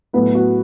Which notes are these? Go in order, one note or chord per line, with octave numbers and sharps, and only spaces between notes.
A2 F#3 A3 B3 B4
F#4